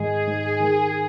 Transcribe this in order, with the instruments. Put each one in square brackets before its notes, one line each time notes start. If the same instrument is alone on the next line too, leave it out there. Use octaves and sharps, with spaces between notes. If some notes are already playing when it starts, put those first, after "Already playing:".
Already playing: [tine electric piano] G#2 D#3 G#3 [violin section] G#4
[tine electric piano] G#2
D#3